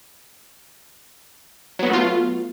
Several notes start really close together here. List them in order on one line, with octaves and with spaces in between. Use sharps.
F#3 B3 F#4 A3 F4